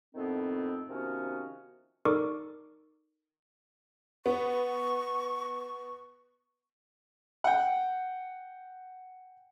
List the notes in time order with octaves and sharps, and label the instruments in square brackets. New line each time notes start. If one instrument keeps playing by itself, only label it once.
[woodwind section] F2 A2 D#3 B3 C4
C3 D#3 F3 B3 C#4 F#4
[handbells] D#4 A4 A#4 D5 C#6 D6
[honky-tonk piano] B3 [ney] C#6
[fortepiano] F#5 G5